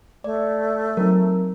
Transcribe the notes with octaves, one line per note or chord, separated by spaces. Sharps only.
A3 D5
F#3 C4 D#4 A#4